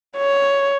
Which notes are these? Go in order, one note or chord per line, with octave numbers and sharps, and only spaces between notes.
C#5